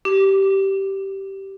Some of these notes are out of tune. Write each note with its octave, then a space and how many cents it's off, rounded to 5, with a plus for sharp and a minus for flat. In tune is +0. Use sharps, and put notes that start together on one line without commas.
G4 -15